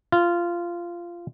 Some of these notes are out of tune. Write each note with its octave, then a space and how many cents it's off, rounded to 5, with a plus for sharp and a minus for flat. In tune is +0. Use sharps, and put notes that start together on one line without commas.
F4 -15